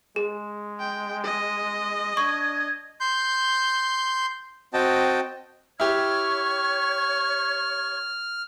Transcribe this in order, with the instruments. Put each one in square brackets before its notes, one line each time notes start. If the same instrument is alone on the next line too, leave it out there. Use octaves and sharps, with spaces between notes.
[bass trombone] G#3 [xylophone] G#4
[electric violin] G5
D#5
[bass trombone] D4 [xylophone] C#6 [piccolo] G#6
[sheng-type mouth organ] C6 G6
C4 F#4 D#5 G5 A5
[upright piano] E4 G4 [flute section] C#5 C#6 G#6 [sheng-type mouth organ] F6